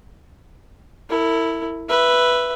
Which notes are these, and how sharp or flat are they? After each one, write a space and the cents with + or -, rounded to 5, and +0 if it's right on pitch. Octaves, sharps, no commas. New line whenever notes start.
E4 +0 A#4 -45
B4 +0 E5 +10